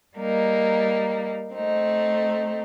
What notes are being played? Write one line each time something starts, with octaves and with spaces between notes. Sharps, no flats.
G3 A#3 D#4
A3 C4 D#4